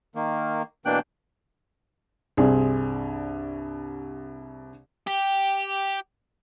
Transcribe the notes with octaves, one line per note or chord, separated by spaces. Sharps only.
D#3 A#3
B2 E3 A#3 D4 G5 F#6
C2 G2 C4 G#4
G4